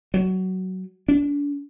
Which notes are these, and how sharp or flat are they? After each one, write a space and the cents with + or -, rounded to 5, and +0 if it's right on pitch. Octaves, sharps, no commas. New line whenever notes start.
F#3 +15
D4 -35